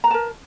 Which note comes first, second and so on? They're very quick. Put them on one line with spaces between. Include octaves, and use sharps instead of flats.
A#5 B4 A5 A#4